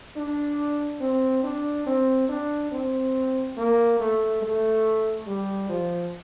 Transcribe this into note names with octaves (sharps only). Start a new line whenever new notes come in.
D4
C4
D4
C4
D4
C4
A#3
A3
A3
G3
F3